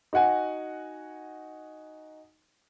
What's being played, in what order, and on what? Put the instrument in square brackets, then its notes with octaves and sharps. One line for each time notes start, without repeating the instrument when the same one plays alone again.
[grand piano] D#4 F#4 F#5 G#5